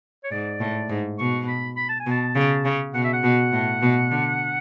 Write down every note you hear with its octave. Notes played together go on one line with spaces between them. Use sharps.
C#5
G#2 D5
A2
G#2
B2 C#6
B5
B5
A5
G#5
B2
A5
C#3
C#3
B2 F#5
E5
F#5
B2
A2
B2
D3